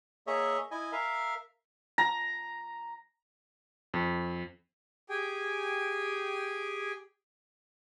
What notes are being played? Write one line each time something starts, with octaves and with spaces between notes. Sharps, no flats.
A#3 G#4 C#5 D#5 E5
E4 D#5 G#5
A#4 E5 F5
A#5
F2
G4 G#4 G5 G#5